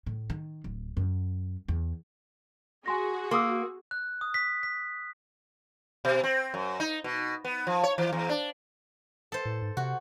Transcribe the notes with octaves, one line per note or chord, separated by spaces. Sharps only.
A2
D#3
D1
F#2
E2
F#4 G#4 G#5 C6 A#6
A#3 C6 D#6 E6
F#6
D#6
B6
B6
B2
C4
F#2
D#4
B2
B3
F3
C#5
E3
E2
D4
A4 C5
A2
G#2
C3 F#4